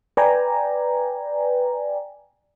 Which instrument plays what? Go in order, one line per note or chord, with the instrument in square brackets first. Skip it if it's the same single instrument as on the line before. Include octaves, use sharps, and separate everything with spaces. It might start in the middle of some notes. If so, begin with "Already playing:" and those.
[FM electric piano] B4 D5 G5 G#5 A#5